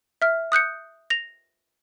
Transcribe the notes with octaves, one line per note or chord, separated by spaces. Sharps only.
E5 F6
D#6 F#6 G6 C#7
A#6 F7